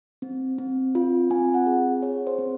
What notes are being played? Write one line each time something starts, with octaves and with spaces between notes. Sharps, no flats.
C4
C4
F4
C4 G#5
F#5
G#4
G#4 C#5
C5
C4